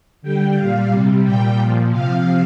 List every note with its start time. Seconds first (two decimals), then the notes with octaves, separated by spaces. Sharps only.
0.22 D3 G3 G5
0.56 A#2 G3 F5
0.90 C3 G3
1.24 A#2 G3 G5
1.58 A#2 F3
1.91 C3 F3 F5